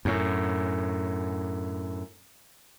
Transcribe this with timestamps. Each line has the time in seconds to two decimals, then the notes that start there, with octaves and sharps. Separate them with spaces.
0.05 F#2 A2